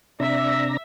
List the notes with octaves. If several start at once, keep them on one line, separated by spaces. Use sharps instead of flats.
C3 D4 E5 A#5